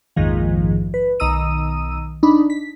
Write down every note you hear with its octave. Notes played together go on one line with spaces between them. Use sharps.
A#1 F2 G#2 D#3 F3
B4
B1 D#3 A#5 D#6 E6 D#7
D4 D#4 B5
B6